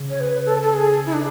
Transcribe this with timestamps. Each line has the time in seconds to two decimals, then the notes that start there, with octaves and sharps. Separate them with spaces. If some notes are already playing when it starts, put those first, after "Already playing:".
Already playing: C#3
0.10 C#5
0.20 B4
0.46 A4
0.63 A4
0.73 G#4
1.06 E4
1.13 D4